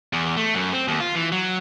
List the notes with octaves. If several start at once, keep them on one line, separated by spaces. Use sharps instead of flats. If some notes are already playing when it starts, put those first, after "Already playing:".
E2
A3
F#2
C4
D#2
F4
E3
F#3